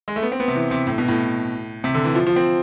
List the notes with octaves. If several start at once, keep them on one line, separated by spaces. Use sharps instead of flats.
G#3
A3
B3
C4
B3
C3
E3
C3
A2
B2
A2
C3
D3
E3
F3
F3
C4